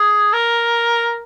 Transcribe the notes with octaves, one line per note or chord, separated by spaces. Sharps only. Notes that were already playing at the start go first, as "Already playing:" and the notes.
Already playing: G#4
A#4